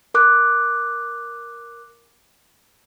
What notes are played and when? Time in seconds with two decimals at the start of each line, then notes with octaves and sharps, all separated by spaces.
0.14 A#4 D6 F#6